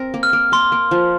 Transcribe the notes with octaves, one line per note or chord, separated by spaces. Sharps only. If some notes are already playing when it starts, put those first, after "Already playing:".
Already playing: C4 A#4
A#3
F6
A#3
A#3 C6
A#3
F3